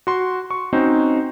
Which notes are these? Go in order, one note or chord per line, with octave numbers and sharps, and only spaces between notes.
F#4 C6
C#6
C4 C#4 D#4 F#4 C5